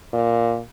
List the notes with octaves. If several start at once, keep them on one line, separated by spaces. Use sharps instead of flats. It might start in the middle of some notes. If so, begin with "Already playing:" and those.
A#2